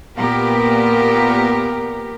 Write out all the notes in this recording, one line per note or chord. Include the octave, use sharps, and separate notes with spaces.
A#2 B3 G4 A#4